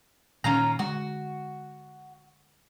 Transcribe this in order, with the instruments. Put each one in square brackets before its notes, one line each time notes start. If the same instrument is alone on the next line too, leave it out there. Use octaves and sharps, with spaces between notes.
[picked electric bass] A#2 D#3 [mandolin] C#4 F4 A#5
[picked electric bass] D3 G#3 [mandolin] F#4